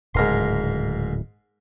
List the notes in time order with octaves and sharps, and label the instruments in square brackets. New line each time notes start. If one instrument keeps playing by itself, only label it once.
[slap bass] D1 C#3 [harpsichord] G#2 A#4 C6